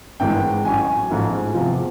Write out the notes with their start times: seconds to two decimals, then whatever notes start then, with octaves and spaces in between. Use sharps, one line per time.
0.20 G#1 G2 E3 G#3 G5
0.65 A1 A2 F#3 G#5
1.10 A1 G#2 F3 A3
1.54 E2 C3 F3